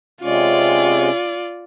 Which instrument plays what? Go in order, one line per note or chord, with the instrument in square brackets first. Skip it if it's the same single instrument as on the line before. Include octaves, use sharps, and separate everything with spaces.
[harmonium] C3 G#3 C#4 [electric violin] F4 D5